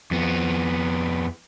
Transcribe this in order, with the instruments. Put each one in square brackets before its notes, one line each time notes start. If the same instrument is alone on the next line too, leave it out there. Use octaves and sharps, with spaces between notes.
[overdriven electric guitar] F2 B3